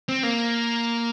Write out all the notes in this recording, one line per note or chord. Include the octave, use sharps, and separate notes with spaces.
C4
A#3